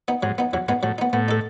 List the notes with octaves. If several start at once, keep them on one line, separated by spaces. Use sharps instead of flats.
B3 D#4
G#2 F#3
B3 D#4
E2 F#3
G#2 B3 D#4
A2 F#3
B3 D#4
A2 B3
D#4 A4